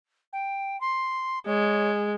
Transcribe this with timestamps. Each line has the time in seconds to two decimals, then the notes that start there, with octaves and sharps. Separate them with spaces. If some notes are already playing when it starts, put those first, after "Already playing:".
0.33 G5
0.81 C6
1.47 G#3 C#5